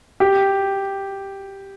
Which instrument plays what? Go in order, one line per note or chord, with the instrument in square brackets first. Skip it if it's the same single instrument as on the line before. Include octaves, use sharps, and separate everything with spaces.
[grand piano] G4